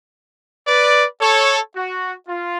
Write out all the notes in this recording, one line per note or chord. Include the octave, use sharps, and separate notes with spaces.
B4 D5
A4 C#5
F#4
F4